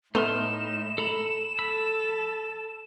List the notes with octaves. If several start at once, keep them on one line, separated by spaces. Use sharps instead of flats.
A2 A3 B3 D#4 C6 F6 E7
A4 A#5 B5
A4 B5 E6